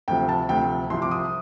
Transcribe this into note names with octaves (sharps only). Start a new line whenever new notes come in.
D2 C3 F3 G5
A5
D2 C3 F3 G5
C2 C3 F3 C6
D6
D#6